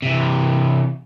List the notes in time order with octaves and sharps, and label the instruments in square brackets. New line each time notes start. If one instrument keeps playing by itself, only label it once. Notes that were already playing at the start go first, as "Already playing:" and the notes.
[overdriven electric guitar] C3 E3